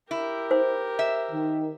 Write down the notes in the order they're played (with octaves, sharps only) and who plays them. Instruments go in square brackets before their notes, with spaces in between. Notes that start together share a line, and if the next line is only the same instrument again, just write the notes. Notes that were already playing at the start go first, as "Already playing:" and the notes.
[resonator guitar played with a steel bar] E4 [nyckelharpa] G4 A#4
[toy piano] C5
[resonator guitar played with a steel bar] E5
[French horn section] D#3